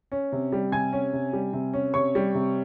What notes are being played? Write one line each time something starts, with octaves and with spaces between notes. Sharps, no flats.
C#4
C3
G3
C3 G#5 G#6
C#4
C3
G3
C3
C#4
C3 C#5 C#6
G3
C3